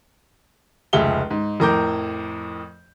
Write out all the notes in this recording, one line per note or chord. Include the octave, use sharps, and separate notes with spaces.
F1 C#2 G#4 E5 G7
G#2
F2 A2 A#4 A#5 D6 G6